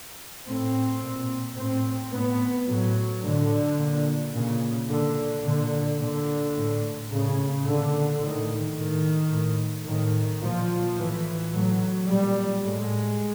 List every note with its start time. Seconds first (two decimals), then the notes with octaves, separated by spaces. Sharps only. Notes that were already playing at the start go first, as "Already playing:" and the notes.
0.47 A2 C4
1.02 A#2
1.57 A2 C4
2.12 A2 B3
2.68 A2 F#3
3.23 A2 D3
3.78 A#2
4.34 A#2 C#3
4.89 A#2 D3
5.45 A#2 D3
5.99 A#2 D3
6.55 A2
7.11 A2 C#3
7.65 A#2 D3
8.21 A2 D#3
8.76 A2 D#3
9.32 A2
9.87 A2 D#3
10.42 A#2 F3
10.97 A2 E3
11.53 A2 F#3
12.08 A#2 G3
12.63 A2 G#3